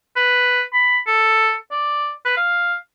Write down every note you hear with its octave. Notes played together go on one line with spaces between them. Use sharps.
B4
B5
A4
D5
B4
F5